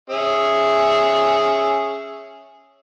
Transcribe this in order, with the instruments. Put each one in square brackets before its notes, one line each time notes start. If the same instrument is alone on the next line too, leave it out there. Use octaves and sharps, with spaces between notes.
[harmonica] C#4 G#4 E5